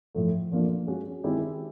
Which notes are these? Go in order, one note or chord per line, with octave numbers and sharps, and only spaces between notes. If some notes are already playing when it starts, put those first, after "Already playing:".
A2 F3 A3
A#2 F3 A#3 D4 F4
G#3 C#4 F#4
D#3 G#3 C4 E4 G4